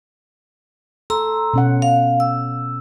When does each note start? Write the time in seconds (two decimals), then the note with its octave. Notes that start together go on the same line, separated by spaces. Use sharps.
1.10 A4 A#5 C6 E6
1.54 B2 C#4 F#5
1.82 F5
2.20 E6